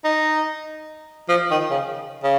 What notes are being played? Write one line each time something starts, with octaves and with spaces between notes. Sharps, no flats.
D#4
F3
D#3
C#3
C#3